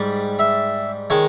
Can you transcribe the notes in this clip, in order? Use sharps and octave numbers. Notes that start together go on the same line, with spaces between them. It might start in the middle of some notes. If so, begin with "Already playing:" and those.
Already playing: G#2 G3
E5
D#3 G#3 C#5